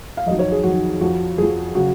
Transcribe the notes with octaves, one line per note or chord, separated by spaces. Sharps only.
F5
F2 D#3 F#3 D#5
C#5
G#4
F2 D#3 F#3 F#4
F2 F3 F#4
F2 F3 G#4
C#3 F#3 F#4